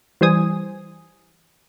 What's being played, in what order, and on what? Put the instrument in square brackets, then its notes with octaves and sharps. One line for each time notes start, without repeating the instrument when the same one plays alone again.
[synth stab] E3 G3 C5 G#5 D#6